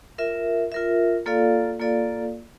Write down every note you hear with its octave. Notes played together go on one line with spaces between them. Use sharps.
F4 A#4 E5
F4 A#4 E5
A#3 F4 A4 D5 F5
A#3 F4 A4 D5 F5